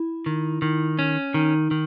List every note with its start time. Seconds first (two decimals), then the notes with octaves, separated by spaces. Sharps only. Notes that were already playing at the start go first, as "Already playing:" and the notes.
Already playing: E4
0.26 D#3
0.62 D#3
0.99 C#4
1.34 D#3 D#4
1.71 D#3